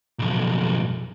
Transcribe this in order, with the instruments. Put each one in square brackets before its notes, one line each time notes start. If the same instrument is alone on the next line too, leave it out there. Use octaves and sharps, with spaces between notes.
[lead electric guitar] B1 F2